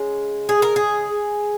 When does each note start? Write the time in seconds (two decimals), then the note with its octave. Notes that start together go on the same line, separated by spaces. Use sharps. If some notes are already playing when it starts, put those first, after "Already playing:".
Already playing: C#3 G#3
0.49 G#4
0.62 A#4
0.76 G#4